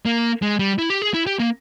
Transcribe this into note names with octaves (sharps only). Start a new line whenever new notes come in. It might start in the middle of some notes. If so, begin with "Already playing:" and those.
A#3
G#3
G3
E4
G4
G#4
E4
G4
A#3